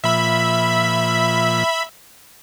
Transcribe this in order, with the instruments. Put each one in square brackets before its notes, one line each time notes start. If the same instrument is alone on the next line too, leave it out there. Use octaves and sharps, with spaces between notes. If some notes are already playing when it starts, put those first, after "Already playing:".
[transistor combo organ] A#2 F3 [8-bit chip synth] E5 B5